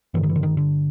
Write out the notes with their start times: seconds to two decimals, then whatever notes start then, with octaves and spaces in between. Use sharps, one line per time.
0.14 G2 D3 E3
0.23 D#3
0.29 E3
0.36 D3
0.43 D#3
0.57 D3